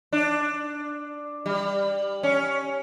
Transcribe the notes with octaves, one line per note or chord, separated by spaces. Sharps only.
D4
G3
C#4